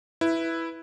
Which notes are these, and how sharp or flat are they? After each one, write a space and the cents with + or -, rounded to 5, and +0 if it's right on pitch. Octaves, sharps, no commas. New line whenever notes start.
E4 +0 B4 +0